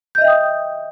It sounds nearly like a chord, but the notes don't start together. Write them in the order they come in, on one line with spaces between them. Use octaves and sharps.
G6 D#5 E5 G5 D#6